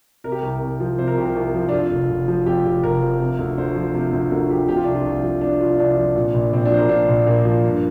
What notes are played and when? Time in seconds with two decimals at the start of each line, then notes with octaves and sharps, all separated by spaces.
0.24 C3 A#4
0.32 G4
0.39 C2 A#4
0.62 C2
0.80 F3
0.98 C3 C5
1.08 A#4
1.17 C2 G4
1.26 A#4
1.35 C2
1.54 F3
1.69 D4
1.72 F2 F4
1.91 F1
2.10 F1
2.28 F3
2.46 F2 G4
2.65 F1 G4
2.83 F1 A#4
3.02 F3
3.20 C3
3.39 D2
3.58 D2 C5
3.75 F3
3.94 C3
4.13 D2
4.31 D2 A#4
4.50 F3 G4
4.68 C3 G4
4.76 F4
4.84 C2 D4
4.93 F4
5.05 C2
5.23 F3
5.41 C3 D4
5.61 C2 F4
5.79 C2 D4
5.97 F3
6.16 A#2
6.34 A#1
6.53 A#1 C4
6.65 D4
6.71 F3 C5
6.77 A#4
6.89 A#2 D4
7.08 A#1
7.26 A#1 A#3
7.45 F3
7.64 G2